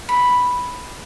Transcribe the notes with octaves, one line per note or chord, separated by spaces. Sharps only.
B5